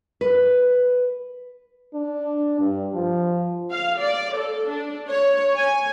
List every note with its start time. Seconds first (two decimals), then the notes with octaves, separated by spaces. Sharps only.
0.21 B4
1.94 D4
2.60 G2
2.94 F3
3.70 F5
4.00 D5
4.35 A4
4.68 D4
5.09 C#5
5.54 G#5